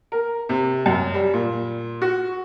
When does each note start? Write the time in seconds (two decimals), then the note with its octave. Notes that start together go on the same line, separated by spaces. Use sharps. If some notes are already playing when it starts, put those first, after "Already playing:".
0.12 A#4
0.49 C3
0.86 F#2
1.14 G3
1.34 A#2
2.02 F#4